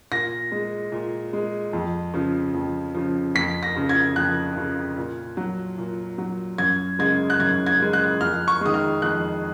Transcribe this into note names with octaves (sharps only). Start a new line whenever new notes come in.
A#2 A#6
G#3
A#2
G#3
F2
C#3 F3
F2
C#3 F3
F2 B6
A#6
C#3 F3
G#6
F2 F#6
C#3 F3
A#2
F#3
A#2
F#3
F#2 G#6
C#3 G#3 G#6
F#6
F#2 G#6
G#6
C#3 G#3
F#6
F2 F6
C#6
D#3 G#3 D#6
F6
F2 F#6